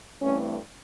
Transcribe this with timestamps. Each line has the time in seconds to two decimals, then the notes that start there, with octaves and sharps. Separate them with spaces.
0.20 G2 E3 A3 C4 C#4